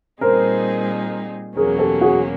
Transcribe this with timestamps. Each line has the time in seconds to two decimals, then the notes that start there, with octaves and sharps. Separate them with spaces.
0.21 A#2 G3 C4 D#4 G#4 A#4 C5
1.56 E2 B2 F#3 A#3 C#4 G#4 A#4
1.79 G4 A4
2.01 F#4 G#4